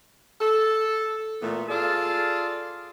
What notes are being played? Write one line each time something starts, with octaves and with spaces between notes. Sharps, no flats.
A4
A#2 E3 A3 B3
F4 G#4 A4 D5